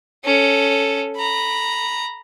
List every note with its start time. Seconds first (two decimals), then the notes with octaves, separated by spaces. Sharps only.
0.25 C#4 A4
1.16 A#5 B5